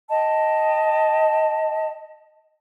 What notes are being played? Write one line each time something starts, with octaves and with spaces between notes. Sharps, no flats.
D#5 G5 A5